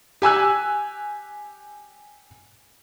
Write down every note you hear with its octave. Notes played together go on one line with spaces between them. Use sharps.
G4 G#5 E6 F#6